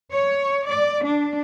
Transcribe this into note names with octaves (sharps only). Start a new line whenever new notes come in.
C#5
D5
D4